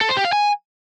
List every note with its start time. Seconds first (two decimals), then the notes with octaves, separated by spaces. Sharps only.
0.01 A4
0.09 C5
0.17 G4
0.25 F5
0.33 G#5